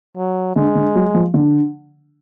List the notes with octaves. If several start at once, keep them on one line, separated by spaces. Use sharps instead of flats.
F#3
D3 G#3
D3
F#3
F3
D3